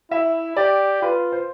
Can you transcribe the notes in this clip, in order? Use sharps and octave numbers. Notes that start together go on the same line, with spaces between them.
E4 E5
G4 D5
F4 B4
C5